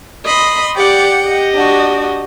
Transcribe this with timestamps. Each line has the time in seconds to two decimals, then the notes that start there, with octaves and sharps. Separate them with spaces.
0.25 D#5 B5 C6
0.76 G4 D5 F#5 G5
1.25 G4 D#5
1.55 D4 F#4